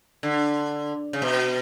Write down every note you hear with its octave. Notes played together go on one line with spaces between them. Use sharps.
D3
C#3
B2